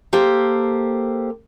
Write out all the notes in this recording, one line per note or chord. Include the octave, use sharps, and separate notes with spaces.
A#3 G4 A4 C5